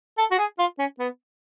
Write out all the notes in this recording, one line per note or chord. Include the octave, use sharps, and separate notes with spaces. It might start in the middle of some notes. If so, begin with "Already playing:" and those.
A4
F#4
G#4
F4
C#4
B3